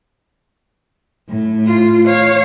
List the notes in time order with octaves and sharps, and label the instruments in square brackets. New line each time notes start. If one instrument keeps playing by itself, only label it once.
[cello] A2
[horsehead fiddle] F4
C#5 F5